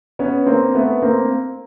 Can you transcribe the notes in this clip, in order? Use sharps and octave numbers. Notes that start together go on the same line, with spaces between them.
B3 C#4
A#3 C4
A3 B3
A#3 C4